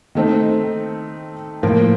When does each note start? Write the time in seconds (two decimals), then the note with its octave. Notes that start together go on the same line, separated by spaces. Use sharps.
0.15 D#3 A3 C4 D#4
1.63 A2 F3 A#3 F4 A#4